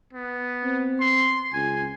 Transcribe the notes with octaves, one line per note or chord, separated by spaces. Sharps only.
B3
C4
C6
C#2 G#5